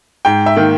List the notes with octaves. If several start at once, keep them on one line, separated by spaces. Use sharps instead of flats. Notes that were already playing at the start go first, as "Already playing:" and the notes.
G#2 G5
E5
D#3 A#3